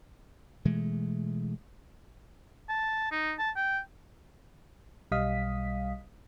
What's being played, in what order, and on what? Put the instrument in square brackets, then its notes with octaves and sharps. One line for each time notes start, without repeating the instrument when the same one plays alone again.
[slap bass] B2 E3 G#3 A3
[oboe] A5
D#4
A5
G5
[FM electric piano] B1 G3 D#5 F5 D#6 B6